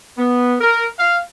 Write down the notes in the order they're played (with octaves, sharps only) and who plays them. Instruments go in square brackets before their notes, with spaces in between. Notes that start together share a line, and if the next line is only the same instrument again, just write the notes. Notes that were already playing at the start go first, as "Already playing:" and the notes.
[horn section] B3
A#4
F5